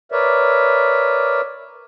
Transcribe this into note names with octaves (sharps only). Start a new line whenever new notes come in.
A#4 B4 C#5 D5 E5